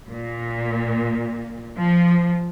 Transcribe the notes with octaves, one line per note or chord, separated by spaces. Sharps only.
A#2
F3